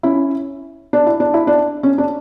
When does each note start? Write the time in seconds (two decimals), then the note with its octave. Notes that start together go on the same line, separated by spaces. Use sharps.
0.03 C#4 E4
0.93 D4
1.06 E4
1.20 D4
1.34 E4
1.47 D4
1.83 C#4
1.98 D4